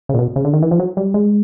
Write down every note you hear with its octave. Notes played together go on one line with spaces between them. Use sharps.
C#3
A#2
B2
C#3
D3
D#3
E3
F3
F#3
G3
G#3